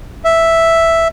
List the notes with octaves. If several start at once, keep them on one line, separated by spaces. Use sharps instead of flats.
E5